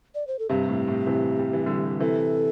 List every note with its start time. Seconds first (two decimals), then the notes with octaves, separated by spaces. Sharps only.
0.15 D5
0.27 C5
0.39 A4
0.49 G2 C3 G4
0.69 A2
0.88 A2
1.07 C3 E3
1.39 G3
1.53 E3
1.66 D3 G3
2.00 C3 E3 A4